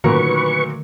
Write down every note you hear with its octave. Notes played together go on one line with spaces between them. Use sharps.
A#2 D3 D#3 F#3 A3 A#4 B4 C#6